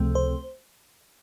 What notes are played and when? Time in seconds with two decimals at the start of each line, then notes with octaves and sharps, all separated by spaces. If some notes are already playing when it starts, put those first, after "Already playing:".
Already playing: C#2 C3 F3 A3 C4
0.15 C5